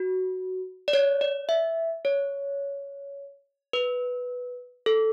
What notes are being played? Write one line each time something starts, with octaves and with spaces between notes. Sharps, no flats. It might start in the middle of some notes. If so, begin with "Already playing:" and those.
Already playing: F#4
D5
C#5
D5
E5
C#5
B4
A4